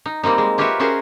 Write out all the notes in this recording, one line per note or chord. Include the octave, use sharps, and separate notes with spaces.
D#4
G3 A#3 C4 D#4
G#3
F4 G4 A#4 B4 C#5 E5
C#4 F#4 G#4 A#4 C5